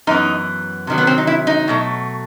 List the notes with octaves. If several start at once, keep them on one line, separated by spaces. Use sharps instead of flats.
F#2 E3 B3 D#4
C3 D#3 F#3
B3
C4
D#4
E4
D#4
B2 F#3 A3